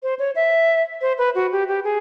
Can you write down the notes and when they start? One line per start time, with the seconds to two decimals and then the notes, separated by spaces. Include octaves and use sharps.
0.03 C5
0.19 C#5
0.36 E5
1.01 C5
1.18 B4
1.35 F#4
1.52 G4
1.68 G4
1.84 G#4